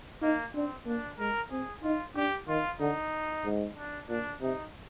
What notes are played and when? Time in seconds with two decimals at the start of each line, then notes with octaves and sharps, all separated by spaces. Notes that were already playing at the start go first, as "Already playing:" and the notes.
0.22 A#3 D#4
0.54 C4 D4
0.86 A#3 D4
1.19 G#3 A#4
1.51 C4 G#4
1.83 D#4 F4
2.16 D4 G4
2.48 D#3 F4
2.80 D3 D#4
3.45 G#2
3.77 D4
4.09 A#2 D4
4.41 C3 D#4